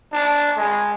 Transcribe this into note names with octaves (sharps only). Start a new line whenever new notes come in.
D4
G#3